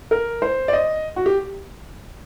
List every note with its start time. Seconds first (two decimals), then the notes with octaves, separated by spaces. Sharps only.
0.11 A#4
0.42 C5
0.68 D5
0.73 D#5
1.16 F#4
1.26 G4